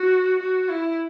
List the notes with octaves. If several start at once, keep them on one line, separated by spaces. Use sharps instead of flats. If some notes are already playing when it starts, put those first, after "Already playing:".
Already playing: F#4
F#4
E4